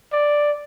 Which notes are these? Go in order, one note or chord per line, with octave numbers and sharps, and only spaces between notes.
D5